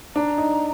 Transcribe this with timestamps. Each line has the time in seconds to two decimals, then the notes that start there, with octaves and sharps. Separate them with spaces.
0.15 D4 A#5
0.38 D#4